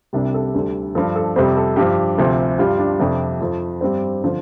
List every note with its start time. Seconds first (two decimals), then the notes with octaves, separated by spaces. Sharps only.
0.13 C2 C3 G3 D4
0.34 A4
0.54 D2 D3 G3
0.95 G2 F3 A4
1.16 A4
1.36 F2 C3 G3 C5
1.57 A4
1.76 G2 F3 G4
2.18 D2 C3 F3
2.58 G2 G3 F4
2.78 D4
3.00 F2 C3 F3 D4
3.40 F2 F3
3.81 G2 G3 C4
4.23 D3 F3